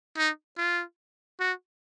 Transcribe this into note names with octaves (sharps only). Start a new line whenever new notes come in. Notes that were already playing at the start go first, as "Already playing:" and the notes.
D#4
F4
F#4